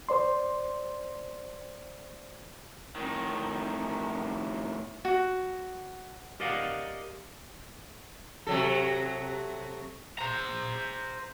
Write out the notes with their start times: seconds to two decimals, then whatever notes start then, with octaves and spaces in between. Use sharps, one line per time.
0.09 C5 D5 C6
2.96 A2 D#3
5.05 F#4
6.40 G4 A#4 D5 D#5 F5 F#5
8.47 C3 F#3 A4
10.19 C5 A#5